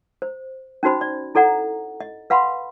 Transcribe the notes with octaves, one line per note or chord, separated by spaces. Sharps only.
C5
C#4 D#4 F#4 C5 B5
D5
E4 A4 D5 F#5 A#5
D#5
B4 F5 F#5 B5 C6